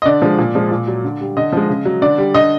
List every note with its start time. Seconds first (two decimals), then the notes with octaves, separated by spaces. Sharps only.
0.02 D#5
0.05 D3 D5
0.22 F3 G#3
0.38 A#2
0.55 F3 G#3
0.71 A#2
0.88 F#3
1.04 D3
1.21 G3
1.37 D3 D#5
1.53 F3 G#3
1.69 C#3
1.85 F#3
2.01 D3 D5
2.18 G3
2.34 D3 D#5